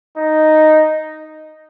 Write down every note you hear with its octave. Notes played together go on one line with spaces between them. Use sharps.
D#4